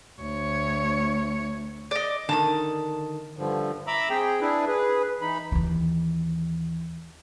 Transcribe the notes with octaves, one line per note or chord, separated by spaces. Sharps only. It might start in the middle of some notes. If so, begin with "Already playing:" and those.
D2 C#5
D5 D#5
D3 D#3 A5 A#5 D#6
G2 D3 F3
E5 A#5 B5 D6 E6
C4 G#4 G5
D4 E4 G#4 B4
G#4 B4
E3 D#4 B5
D#2 E3